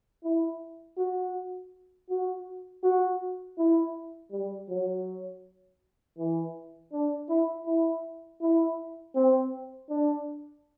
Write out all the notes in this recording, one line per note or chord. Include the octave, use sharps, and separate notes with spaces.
E4
F#4
F#4
F#4
E4
G3
F#3
E3
D4
E4
E4
E4
C4
D4